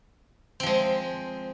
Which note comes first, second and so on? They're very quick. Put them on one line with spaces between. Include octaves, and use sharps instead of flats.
C4 F3 G#3